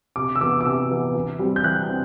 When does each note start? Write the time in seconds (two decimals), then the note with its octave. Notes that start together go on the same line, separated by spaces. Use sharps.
0.16 C3 D6
0.36 E6
0.40 E3 B3 D6
0.61 D6
0.65 C3 E6
0.91 E3 B3
1.15 E3
1.39 G3 C4
1.56 G6
1.64 E3 F#6
1.89 C4